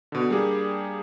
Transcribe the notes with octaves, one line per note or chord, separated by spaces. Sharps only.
B2 D3
G3 A#3 D4 G4 G#4